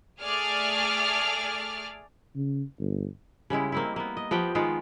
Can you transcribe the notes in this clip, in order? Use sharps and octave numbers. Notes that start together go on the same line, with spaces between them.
A3 G#4 D5 F6
C#3
G1
C#3 G3 G#3 E4
A#3 C4 E4
A#3 B3
D#5
F3 B3 G4 G5
D#3 G#3 B3 F4